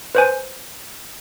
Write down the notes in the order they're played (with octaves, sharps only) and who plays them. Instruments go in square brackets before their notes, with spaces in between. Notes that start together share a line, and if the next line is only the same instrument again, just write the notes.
[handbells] B4 C5 G#5